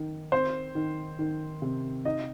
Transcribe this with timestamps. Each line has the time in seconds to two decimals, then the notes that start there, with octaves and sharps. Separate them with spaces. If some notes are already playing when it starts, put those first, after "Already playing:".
Already playing: D#3
0.32 C4 C5
0.75 D#3
1.19 D#3
1.62 C3
2.05 D#4 D#5